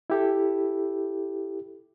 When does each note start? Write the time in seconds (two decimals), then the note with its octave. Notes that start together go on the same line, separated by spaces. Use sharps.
0.10 E4 G4 A4